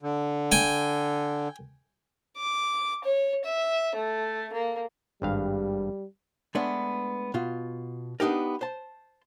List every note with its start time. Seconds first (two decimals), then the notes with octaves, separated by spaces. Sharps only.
0.02 D3
0.52 G5 G#5
2.37 D6
3.04 C#5
3.45 E5
3.95 A3
4.53 A#3
5.22 G#1 G2 G3 F5
6.55 G#3 A3 B3 D4
7.34 B2 F4
8.20 B3 D4 D#4 G4 A#4
8.61 C5 A5